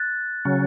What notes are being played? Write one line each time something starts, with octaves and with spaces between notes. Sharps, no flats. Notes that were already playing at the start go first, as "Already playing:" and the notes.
Already playing: F#6 A6
C#3 F#3 C#4